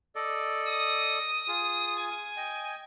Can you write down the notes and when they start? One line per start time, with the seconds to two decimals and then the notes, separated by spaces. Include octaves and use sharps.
0.16 A4 D5 D#5
0.67 D#6
1.48 F4 G#4
1.97 G#5
2.37 D#5 G5